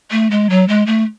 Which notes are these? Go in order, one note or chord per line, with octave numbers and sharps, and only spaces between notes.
A3
G#3
F#3
G#3
A3